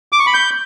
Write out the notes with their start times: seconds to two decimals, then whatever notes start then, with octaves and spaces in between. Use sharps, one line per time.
0.12 D6
0.20 C#6
0.27 B5
0.34 G6